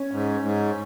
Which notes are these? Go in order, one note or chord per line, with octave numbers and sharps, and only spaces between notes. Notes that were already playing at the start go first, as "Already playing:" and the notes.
Already playing: C#4
G#2
G#2